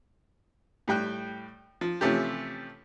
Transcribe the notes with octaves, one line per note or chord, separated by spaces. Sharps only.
A2 G3 G5 F#6
F3
C3 E3 F3 A3 C#4 G4